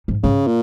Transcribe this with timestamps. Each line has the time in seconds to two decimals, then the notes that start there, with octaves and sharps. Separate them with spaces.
0.08 G#2
0.23 G#2 C#3
0.47 A#2